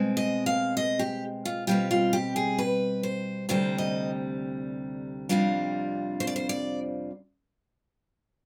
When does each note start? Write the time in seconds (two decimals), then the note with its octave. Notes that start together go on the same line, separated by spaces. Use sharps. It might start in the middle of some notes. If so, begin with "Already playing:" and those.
Already playing: B2 G#3 C4
0.17 D#5
0.46 F5
0.77 D#5
0.99 G4
1.45 F4
1.67 B2 G3 C4 F4 G4
1.91 F4
2.13 G4
2.36 G#4
2.59 B4
3.03 C5
3.49 D2 C3 G3 C5
3.78 D#5
5.29 F2 C3 G3 D4 F4
6.20 C5
6.27 D5
6.36 C5
6.49 D5